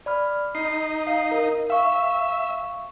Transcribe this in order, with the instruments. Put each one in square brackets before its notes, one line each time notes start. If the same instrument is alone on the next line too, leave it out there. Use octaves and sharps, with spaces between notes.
[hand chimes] D5 B5 F6
[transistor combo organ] D#4 [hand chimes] C7
[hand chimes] F5 C7
A#4
[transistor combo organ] E5 [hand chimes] F5 C#6